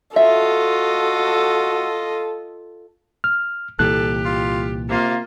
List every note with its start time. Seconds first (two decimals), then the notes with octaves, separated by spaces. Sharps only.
0.16 F4 F#4 A4 D#5 E5
3.24 F6
3.79 C2 A#2 E3 G4 A4 F#6
4.25 F4
4.89 C3 A#3 F4